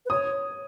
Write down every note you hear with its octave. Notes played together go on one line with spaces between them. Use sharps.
B4
C#5 D#6